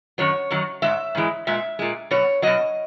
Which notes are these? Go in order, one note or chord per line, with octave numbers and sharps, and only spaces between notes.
F#2 D#3 F#3 C#5
F#2 D#3 F#3
G#2 E3 G#3 E5
G#2 E3 G#3
A#2 G#3 E5
A#2 G#3
B2 F#3 C#5
B2 F#3 D#5